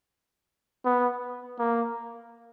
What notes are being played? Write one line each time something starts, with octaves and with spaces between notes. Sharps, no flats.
B3
A#3